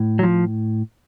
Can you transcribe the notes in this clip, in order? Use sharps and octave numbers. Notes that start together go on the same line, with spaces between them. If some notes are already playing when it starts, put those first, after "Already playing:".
Already playing: A2
F#3
F3